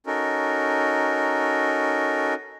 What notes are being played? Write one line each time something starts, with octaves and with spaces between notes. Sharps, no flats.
C#4 D#4 F#4 A4 A#4